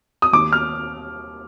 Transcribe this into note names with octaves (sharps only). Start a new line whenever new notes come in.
D#6
D#2 D6
F6